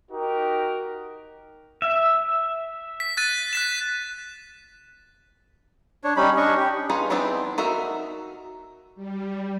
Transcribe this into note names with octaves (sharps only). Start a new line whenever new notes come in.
D#4 F#4 G4 A#4
E5
B6
F#6 A6 D#7
F#6 B6 E7
D4 C#5
G3 C#4 D#4 B5
C#4 D4 D#5 C#6
G4
D#4 F4 G#4 B4
E3 B3 C4 D4 D#4
D#4 F#4 A#4 E5
G3